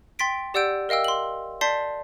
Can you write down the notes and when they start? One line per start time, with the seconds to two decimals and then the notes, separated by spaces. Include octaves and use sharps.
0.19 G5 C6 A6 B6 D7
0.54 G4 D5 F#5 E6 G6 D7
0.89 A#4 D#5 F5 G5 E6
1.04 C6 F#7
1.61 D5 A5 C6 G6 B6 C7